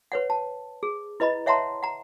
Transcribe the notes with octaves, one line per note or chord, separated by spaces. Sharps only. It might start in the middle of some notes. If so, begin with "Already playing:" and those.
B4 C#5 F#5
A5
G#4
E4 B4 D#5 A#5 B5
C#5 E5 F#5 A5 A#5 C6
F#5 A#5